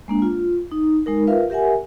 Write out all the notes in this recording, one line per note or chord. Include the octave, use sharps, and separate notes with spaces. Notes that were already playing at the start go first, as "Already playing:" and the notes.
G#3 A#3 D4
F4
D#4
G#3 D#4 A#4
F4 A#4 B4 E5 F5
G4 A#4 E5 F#5 G#5